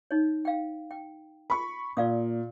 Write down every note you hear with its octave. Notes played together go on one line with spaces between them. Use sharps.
D#4 C#5
F5 G5
G5
B5 C#6
A#2 D5 F5 D#6